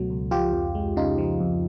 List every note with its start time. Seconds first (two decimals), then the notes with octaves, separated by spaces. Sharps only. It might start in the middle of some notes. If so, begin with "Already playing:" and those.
Already playing: C#2 B2 F#3 A3 F#4
0.10 C#2
0.31 F3 F4 G4
0.53 F2
0.75 G#3
0.97 C#3 D#4 F4
1.18 F3
1.40 F2